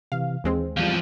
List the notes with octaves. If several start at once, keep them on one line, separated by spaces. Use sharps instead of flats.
C3 E3 F5
D#2 E3 G#3 C4
E2 F3 G3 F5